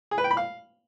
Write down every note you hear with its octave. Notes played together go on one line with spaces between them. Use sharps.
G#4
B4
G5
B5
F5